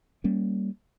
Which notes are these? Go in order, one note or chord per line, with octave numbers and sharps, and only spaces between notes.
G3 A#3 C#4